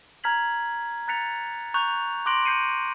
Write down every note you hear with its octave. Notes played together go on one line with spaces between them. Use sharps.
A#5 F6 G#6 B6 F#7
A#5 F#6 A6 B6 C#7 F7
A#5 C#6 F#6 G6 F7
C6 D6 F#6 A#6 D7 F#7
G6 C7 C#7 D#7